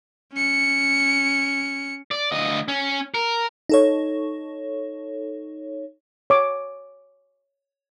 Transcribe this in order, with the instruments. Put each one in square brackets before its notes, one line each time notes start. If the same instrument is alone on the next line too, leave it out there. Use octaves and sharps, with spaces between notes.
[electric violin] C#4 C#7
[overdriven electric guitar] D5
D2 D#5
C#4
A#4
[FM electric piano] D#4 A4 C#5
[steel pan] C#5 D6